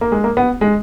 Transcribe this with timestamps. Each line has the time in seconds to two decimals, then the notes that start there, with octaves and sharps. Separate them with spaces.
0.01 A#3
0.12 G#3
0.24 A#3
0.37 B3
0.61 G#3